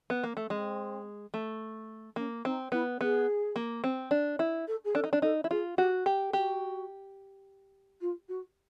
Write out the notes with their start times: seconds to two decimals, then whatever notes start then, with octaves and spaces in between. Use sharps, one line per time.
0.10 B3
0.24 A#3
0.37 A3
0.50 G#3 C4
1.34 A3
2.16 A#3 C#4
2.45 C4 D#4
2.72 B3 E4
3.00 B3 G#4
3.56 A#3
3.84 C4
4.11 D4
4.39 E4
4.67 A4
4.84 G#4
4.95 D4 A4
5.04 D#4
5.13 D4
5.22 D#4 A4
5.44 E4
5.50 F4 G#4
5.77 F#4 G4
6.06 G4
6.33 F#4 G4
8.01 F4
8.28 F#4